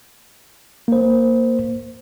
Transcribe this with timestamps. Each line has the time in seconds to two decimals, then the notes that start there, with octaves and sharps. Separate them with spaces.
0.88 A#3 C5